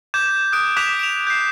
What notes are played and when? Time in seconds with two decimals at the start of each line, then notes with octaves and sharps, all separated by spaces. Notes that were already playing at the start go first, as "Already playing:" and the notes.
0.14 D6 G6 G#6 E7
0.52 D#6 F#6 D7
0.77 D6 F#6 G#6 B6 E7 F7
0.99 D7 F7
1.27 G6 C7